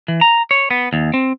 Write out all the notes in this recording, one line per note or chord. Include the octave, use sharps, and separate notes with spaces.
E3
A#5
C#5
B3
D#2
C4